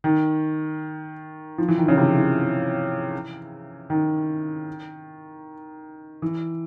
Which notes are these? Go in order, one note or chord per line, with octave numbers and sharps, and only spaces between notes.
D#3
F3
E3
D#3
C#3
C3
E3
D#3
E3